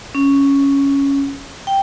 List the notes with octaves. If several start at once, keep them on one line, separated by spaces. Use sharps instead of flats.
C#4
G5